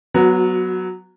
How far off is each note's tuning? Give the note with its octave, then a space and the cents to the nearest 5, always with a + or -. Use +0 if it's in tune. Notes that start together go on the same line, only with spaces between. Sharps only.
F#3 +0 B3 +0 F#4 -30